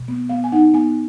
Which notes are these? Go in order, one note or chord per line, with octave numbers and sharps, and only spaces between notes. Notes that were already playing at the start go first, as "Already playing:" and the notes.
Already playing: B2
B3
B3 F5
G#5
D#4 F#5
B3 G#5